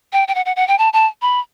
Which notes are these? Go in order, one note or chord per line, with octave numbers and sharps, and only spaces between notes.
G5
G5
F#5
F#5
F#5
G5
A5
A5
B5